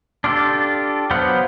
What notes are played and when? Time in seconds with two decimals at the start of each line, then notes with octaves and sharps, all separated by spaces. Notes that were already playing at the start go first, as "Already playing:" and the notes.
0.24 D4 F4 G4 A4
1.11 F#3 B3 C5 F5 F#5